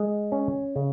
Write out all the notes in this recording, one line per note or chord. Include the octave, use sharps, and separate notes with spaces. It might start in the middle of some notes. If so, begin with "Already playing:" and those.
Already playing: G#3
C#4
C#3